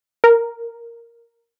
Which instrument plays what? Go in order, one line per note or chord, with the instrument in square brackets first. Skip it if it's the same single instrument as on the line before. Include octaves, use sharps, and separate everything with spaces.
[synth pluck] A#4